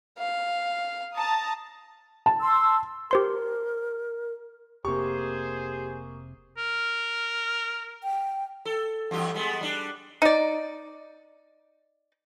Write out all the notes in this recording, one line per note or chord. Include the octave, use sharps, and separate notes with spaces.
F5
A5 A#5 D#6
A5
C6 E6
G4 A#4 C5 C6
F1 C3 A#3 G4 G#4 C5 C#6
A#4
G5
A4
E2 G2 G4
G3 G#3 B3
G3 D4
D#4 D5